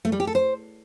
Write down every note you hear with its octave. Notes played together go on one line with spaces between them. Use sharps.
A3
G3
G4
A4
C5